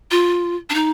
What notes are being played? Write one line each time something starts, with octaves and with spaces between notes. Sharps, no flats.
F4
D4
D#4